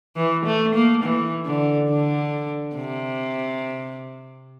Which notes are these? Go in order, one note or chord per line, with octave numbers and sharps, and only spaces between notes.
E3
A3
A#3
E3
D3
D3
C3